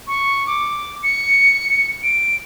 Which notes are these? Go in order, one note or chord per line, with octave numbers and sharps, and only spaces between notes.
C#6
D6
C#7
D7